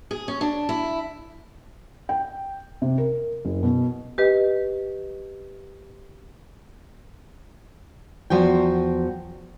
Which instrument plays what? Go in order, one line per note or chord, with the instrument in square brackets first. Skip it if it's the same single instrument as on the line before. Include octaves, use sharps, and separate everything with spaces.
[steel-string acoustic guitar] G#4
C#4
D4
E4
[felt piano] G5
C3
A#4
F#1
B2
[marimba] G4 B4 D#5
[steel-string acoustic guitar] E2 F3 F#4 G5